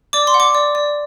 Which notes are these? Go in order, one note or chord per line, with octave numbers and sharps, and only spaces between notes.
D5 D6
C6
F#5
D6
D5
D5